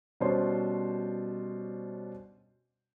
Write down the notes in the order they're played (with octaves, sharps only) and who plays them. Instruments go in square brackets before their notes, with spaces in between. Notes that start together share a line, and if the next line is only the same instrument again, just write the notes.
[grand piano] B2 G3 C#4 D4 C5 C6